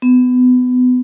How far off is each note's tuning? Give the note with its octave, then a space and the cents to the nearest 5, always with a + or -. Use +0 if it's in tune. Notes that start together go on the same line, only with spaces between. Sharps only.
B3 +25